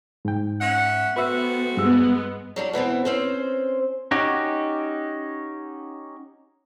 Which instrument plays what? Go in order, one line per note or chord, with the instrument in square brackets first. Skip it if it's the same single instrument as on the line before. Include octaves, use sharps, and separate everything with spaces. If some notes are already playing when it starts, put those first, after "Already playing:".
[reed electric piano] G#2 G5
[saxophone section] C#4 E5 F#5
[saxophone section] A3 C4 F#4 [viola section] B3 [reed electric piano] B4 E5
[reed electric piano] G2 E6 [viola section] G#3 B3
[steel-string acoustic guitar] F#3 G3 D4
B2 E3 B3 C4
C4 C#4 C5
[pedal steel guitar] C#4 D#4 F#4 G4